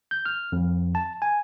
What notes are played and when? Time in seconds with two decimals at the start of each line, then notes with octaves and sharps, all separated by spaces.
0.11 G6
0.26 F6
0.52 F2
0.95 A5
1.22 G#5